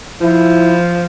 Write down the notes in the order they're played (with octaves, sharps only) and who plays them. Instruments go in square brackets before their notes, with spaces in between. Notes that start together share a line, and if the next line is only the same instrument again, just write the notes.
[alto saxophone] F3 [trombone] E4